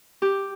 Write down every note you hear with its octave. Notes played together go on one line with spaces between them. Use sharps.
G4